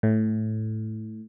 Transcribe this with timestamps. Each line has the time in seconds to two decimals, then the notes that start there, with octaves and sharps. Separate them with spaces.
0.03 A2